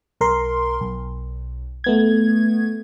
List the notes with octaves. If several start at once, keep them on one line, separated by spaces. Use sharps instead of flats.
B1 A#4 C6
B1
A3 B3 G#6